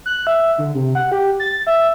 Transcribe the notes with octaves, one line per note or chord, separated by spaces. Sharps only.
F#6
E5
D3
C3
F#5
G4
A6
E5